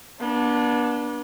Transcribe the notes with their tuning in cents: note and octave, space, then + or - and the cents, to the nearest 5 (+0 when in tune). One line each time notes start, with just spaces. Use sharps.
B3 -40 D4 +0